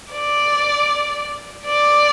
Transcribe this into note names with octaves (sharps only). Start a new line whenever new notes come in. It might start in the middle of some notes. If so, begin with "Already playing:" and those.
D5
D5